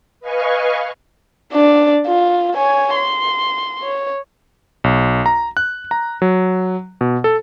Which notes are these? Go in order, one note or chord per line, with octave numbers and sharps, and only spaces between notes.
B4 D#5 F5 G#5 C#6
D4 D5
F4
C#5 G#5
C6
C#5
B1
A#5
F#6
A#5
F#3
B2
A4